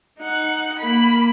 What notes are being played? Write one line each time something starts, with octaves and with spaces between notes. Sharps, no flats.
D#4 F#5
A#3 B5